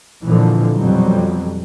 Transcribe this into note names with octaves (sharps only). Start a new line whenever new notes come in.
F2 A#2 D3 E3 F3
F2 B2 E3 F#3 G3